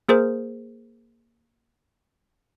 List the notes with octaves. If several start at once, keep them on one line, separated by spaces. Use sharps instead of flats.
A#3 G#4 A#4 C5